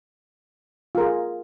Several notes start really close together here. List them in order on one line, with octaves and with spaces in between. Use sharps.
F4 A#4 G#4